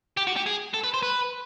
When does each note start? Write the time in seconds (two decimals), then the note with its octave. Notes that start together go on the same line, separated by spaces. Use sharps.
0.17 G4
0.27 F#4
0.36 G4
0.46 G#4
0.74 A4
0.84 B4
0.94 C5
1.03 B4